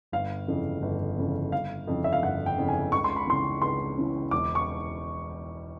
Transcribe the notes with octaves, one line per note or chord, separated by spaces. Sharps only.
G1 F5
F2 C#3 E3
G1
F2 C#3 E3
G1 F5
F2 C#3 E3
E5
F5
G1 F#5
G5
F2 C#3 E3
G#5
C#2 C#6
C6
B5
C#3 E3 C6
C#2 C6
C#3 E3
E1 D6
C#6